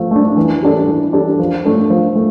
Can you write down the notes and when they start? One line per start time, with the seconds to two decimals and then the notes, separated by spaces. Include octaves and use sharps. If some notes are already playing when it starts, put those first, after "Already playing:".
Already playing: F3 A3
0.11 A3 D4
0.37 E3
0.63 G3 D4 A4
0.88 E3
1.13 G3 D4 A4
1.39 F3
1.64 A3 D4 A4
1.90 F3
2.15 A3